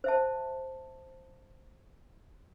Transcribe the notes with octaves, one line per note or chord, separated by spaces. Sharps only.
C5 E5 A5